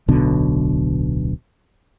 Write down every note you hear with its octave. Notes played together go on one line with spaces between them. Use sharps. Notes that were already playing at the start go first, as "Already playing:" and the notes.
D1 B1 B2 D3